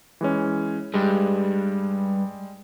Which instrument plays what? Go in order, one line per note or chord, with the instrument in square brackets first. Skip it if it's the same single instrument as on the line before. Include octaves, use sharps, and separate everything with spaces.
[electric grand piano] E3 G#3 C#4
[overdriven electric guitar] G2 [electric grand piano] G3 G#3